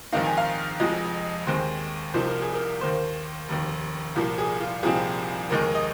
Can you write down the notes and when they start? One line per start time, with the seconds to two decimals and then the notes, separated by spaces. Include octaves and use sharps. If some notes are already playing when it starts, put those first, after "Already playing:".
0.12 A#1 G#2 D#3 C4 D#4 F5
0.25 G#5
0.38 F5
0.80 F1 F2 F3 G#3 D#5
1.47 D#2 D#3 G#3 C4 C5
2.14 C2 C3 F3 A#3 D#4 C5
2.28 A#4
2.42 G#4
2.55 A#4
2.81 D#2 D#3 A#3 C5
3.49 F1 D#2 D#3
4.16 C2 A#2 F3 A#3
4.38 G#4
4.61 F4
4.83 C2 A#2 F3 C4 D#4 G#4
5.50 F1 D#2 D#3 G#3 D#4 A#4
5.75 D#5